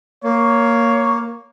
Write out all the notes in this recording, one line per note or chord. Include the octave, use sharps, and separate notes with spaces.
A#3 C#5